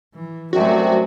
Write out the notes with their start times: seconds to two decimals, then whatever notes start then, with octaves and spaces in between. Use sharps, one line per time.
0.15 E3
0.53 C2 F#2 C3 F#3 A3 F#4